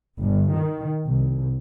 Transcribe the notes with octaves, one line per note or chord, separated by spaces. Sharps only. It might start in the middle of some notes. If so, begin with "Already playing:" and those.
G1
D#3
C2